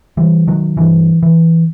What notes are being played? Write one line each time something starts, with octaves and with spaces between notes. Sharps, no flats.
E3 G3
D#3 F#3
G2 E3
E3